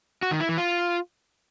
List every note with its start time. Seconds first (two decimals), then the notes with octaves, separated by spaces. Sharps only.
0.22 F#4
0.31 D#3
0.40 E4
0.49 E3
0.58 F4